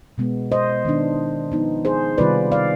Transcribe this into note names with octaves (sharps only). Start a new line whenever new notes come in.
B2 G#3 B3
C5 D#5
D#3 B3 D4
F3 B3 D#4
G#4 C5
C3 D#3 G3 B3 F4 B4 D5
D5 F5